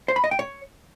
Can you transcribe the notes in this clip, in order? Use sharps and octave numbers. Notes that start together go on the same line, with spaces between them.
C5
B5
D#5
G5
C#5